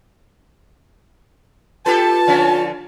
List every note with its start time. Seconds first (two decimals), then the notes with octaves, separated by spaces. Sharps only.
1.86 F4 G4 A4 B4 A5
2.27 D3 F3 C#4